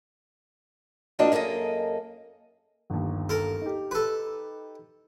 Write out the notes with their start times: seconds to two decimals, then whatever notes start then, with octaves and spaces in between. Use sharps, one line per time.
1.19 F3 A#3 C4 D4 F#4 D#5
1.32 F#2 A#3 G#4 A4 D#5
2.90 G1 D#2
3.29 A4 A#4
3.62 D#4 G4
3.91 A4 B4